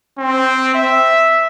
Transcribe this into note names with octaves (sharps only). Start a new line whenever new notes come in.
C4
E5